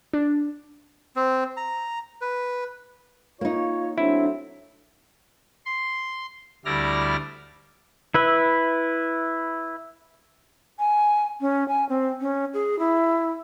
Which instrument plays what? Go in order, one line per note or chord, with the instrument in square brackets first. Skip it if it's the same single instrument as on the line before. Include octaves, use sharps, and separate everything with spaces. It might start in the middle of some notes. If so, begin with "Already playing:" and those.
[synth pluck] D4
[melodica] C4
A#5
B4
[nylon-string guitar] A#3 D#4 [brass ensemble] F4 C#5
[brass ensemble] F#3 A3 C4 [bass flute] D4 [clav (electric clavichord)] E4
[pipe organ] C6
D2 G3 E4 D5 F6 A#6
[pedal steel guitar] E4 B4 E5
[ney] G#5
C#4
G#5
C4
C#4
G#4
E4